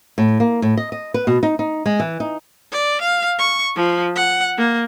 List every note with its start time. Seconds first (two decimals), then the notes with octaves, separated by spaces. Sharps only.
0.18 A2
0.40 A#3
0.62 A2
0.77 D#5
0.92 D#5
1.14 B4
1.27 B2
1.43 D#4
1.59 D#4
1.86 G#3
2.00 E3
2.20 D#4
2.72 D5
3.02 F5
3.39 C#6
3.76 F3
4.15 F#5
4.57 A#3